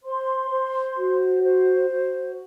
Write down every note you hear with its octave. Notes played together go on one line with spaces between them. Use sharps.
C5 C6
C5
F#4
C5
F#4